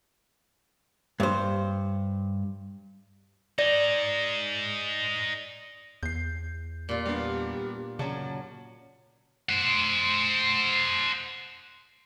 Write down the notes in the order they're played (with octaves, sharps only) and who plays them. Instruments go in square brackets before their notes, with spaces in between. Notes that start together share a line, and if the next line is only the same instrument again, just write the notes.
[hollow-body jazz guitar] G2 C5
[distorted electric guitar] D#4 G#4 [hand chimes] D5
[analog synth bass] E2 [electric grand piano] G6 C7
[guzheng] A#2 F4 [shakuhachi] G4
[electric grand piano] G3 B3 D4 [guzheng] F5
[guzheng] F#2 F#3 [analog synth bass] C#3 [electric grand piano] D5 A5
[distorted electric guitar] C5 F#5